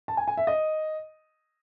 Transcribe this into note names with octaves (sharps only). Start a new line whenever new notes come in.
A5
G#5
G#5
E5
D#5